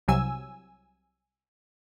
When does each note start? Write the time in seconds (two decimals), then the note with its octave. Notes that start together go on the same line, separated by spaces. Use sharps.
0.08 C2 C3 F#3 G#5 E6